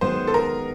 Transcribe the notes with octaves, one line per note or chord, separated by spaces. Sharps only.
F#2 D#3 G#3 B3 C5
A4
A#4